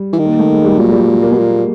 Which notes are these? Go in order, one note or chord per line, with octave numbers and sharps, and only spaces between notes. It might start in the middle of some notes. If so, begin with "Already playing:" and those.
Already playing: G3
E3
D#3
A#3
A3
G#3
G3
A#2 F#3
G3
G3
A#3
B2
A#2